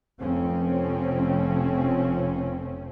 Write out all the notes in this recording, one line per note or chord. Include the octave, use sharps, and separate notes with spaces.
F1 F2 F3 C4 C#4